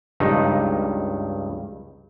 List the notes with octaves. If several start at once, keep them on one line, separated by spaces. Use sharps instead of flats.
C#2 G2 D#4